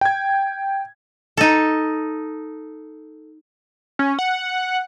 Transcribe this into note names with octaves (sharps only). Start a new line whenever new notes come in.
G5 G#6
D#4 A4
C#4
F#5